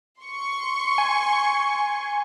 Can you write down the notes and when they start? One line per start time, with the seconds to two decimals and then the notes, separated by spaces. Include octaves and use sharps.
0.20 C6 C#6
0.98 G#5